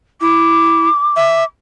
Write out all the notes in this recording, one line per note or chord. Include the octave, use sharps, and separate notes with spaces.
E4 D6
E5